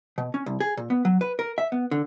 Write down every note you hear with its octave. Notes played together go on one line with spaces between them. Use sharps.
B2
C#4
C2
G#4
A#2
B3
F#3
B4
A#4
E5
B3
D3